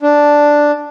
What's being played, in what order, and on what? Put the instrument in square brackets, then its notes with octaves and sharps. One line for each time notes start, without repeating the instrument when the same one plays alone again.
[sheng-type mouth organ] D4